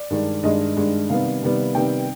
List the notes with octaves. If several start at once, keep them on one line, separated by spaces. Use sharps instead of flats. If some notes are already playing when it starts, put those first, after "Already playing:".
Already playing: D5
G2 D#3 G#3 D4
G2 D#3 G#3 D4 D#5
G2 D#3 G#3 D4
C3 D#3 G3 B3 F5
C3 D#3 G3 B3
C3 D#3 G3 B3 G5